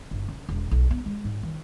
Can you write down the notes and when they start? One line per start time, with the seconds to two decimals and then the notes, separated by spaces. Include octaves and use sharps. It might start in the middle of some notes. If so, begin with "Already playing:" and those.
0.11 G1
0.28 C#3
0.49 E1
0.71 B1
0.91 B3
1.06 G#3
1.24 G#2
1.43 D#3